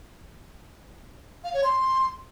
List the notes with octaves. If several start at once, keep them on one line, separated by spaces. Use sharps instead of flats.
F5
C#5
C6